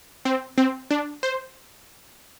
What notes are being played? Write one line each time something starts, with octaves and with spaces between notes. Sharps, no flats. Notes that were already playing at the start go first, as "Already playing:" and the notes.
C4
C4
D4
C5